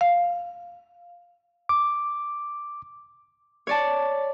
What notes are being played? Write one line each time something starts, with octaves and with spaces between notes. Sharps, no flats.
F5
D6
C#5 D5 A5